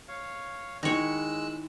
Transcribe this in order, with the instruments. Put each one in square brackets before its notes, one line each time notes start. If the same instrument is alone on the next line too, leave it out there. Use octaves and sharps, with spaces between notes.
[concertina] C#5 F5
[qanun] D#3 E4 [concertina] G#3 E6 F#6 [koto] D#4 C#5